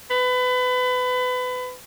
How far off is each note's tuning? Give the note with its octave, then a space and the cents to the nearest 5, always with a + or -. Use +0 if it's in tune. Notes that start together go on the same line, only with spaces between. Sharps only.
B4 +25